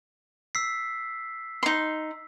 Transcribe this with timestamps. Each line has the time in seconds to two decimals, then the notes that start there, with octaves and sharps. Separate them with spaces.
0.55 E6 B6 C7
1.63 D#4 C6